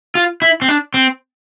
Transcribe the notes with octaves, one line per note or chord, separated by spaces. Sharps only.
F4
E4
C4
D4
C4